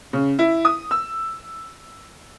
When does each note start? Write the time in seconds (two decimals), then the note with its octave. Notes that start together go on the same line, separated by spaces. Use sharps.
0.13 C#3
0.39 E4
0.65 D#6
0.91 E6